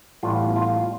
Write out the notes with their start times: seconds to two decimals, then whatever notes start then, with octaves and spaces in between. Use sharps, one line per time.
0.23 A1 A2 G3 B3 F4
0.56 F4